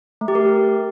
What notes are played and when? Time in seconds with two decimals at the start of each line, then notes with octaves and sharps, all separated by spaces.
0.21 A3
0.28 G4
0.35 A#4